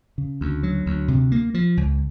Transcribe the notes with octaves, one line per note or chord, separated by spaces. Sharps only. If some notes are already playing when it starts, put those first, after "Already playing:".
C#3
D2
F#3
D2
C3
A#3
F3
C#2